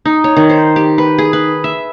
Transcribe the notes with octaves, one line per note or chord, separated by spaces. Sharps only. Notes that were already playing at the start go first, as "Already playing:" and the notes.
D#4
C#5
D#3
C5
G4
B4
G#4
B4
E5